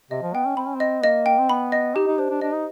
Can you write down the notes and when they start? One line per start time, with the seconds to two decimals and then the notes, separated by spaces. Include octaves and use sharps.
0.11 C3 D#5
0.22 F3
0.34 B3 G5
0.46 C#4
0.57 C4 B5
0.66 C#4
0.76 C4 D#5
1.03 A#3 D#5
1.26 G5
1.39 C4
1.49 B3 B5
1.72 D#5
1.95 D#4 G4
2.08 D#4
2.18 D4 C5
2.30 D4
2.42 D4 D#5
2.53 D#4